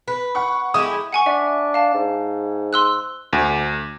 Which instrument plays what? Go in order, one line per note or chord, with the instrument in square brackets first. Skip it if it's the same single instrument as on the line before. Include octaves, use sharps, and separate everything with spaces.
[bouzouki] B4
[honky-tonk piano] F#5 C#6
[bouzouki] G#3 E4 G4 [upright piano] D#6
[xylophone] F#5 G#5 C#6
[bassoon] D4 [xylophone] E5
[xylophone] F5 A5
[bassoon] G#2
[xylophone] C6 E6 F#6
[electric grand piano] D2